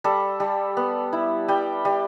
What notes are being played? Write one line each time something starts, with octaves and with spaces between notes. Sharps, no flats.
G3 A4
G3
B3
E4
G3 G5
G3